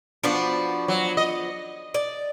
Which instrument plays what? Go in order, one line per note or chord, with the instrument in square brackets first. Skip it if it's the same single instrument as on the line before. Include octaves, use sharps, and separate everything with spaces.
[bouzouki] F3 B3 F#4 [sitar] D4
[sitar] F#3
D#5
[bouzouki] D5